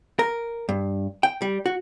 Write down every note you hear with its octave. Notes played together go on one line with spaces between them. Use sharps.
A#4
G2
G5
G3
F#4